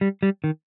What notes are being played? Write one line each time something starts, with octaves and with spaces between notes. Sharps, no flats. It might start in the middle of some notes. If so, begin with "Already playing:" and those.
G3
G3
D#3